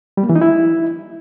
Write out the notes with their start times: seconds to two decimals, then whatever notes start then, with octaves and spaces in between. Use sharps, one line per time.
0.17 G3
0.23 A#3
0.29 E3
0.35 D#4
0.41 E4